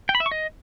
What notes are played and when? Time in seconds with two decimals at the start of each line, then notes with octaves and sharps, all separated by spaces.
0.09 G5
0.15 B5
0.20 E5
0.26 C#6
0.31 D#5